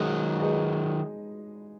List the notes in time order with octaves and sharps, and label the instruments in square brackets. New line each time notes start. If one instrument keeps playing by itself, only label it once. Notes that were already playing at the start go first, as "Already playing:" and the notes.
Already playing: [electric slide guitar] D#3 F#3 [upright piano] G#3 D#4 G#4 D#5
[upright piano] G#3 D#4 G#4 B4 D#5